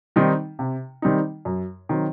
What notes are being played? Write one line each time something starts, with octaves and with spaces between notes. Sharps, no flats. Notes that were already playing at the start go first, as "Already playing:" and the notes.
D#3 G3 C4 D#4
C3
D#3 G3 C4 D#4
F#2
D#3 F#3 C4